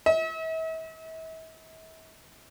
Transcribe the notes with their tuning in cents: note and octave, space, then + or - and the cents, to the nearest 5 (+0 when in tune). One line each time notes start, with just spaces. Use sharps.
E5 -40